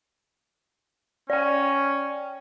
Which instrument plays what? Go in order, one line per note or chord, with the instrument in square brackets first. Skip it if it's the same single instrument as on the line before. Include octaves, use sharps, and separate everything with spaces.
[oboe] C#4 [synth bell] D5 G5